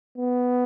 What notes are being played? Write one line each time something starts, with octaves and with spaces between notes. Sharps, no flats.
B3